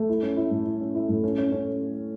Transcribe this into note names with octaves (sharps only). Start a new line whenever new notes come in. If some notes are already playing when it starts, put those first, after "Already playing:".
Already playing: A3
E4
C#4
E4
A2
E4
C#4
E4
A2
C#4
C#4
C#4